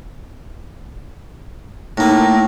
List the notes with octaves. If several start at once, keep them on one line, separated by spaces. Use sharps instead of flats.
A2 A#3 D#4